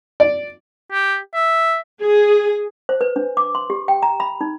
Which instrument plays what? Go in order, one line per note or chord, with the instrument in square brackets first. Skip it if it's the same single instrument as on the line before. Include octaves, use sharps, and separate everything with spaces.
[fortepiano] D5
[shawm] G4
E5
[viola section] G#4
[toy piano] C5
B4
D4
D6
C6
G4
G5
A#5
B5
D#4